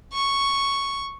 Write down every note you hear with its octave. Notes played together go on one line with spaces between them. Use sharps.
C#6